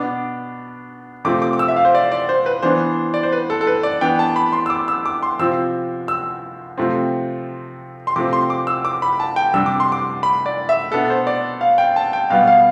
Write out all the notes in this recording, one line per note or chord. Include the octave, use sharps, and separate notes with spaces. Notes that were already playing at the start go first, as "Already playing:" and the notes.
Already playing: B2 B3 D4 D6
C3 F3 A3 C4 D6
D6
D6
E6
E5
F5
C5
D5
D5
C5
B4
E3 B3 D4 C5
D5
C5
B4
A4
A4
B4
D5
E3 B3 D4 G5
A5
B5
C6
E6
D6
E6
D6
C6
C3 F3 C4 E6
E6
C3 F3 A3 C4
C6
C3 F3 A3 C4 D6
C6
D6
E6
D6
B5
A5
G5
C3 G3 D4 E6
D6
C6
D6
B5
D5
E5
B2 B3 D4 A4
C5
D5
F5
G5
A5
G5
B2 G3 B3 F5
F5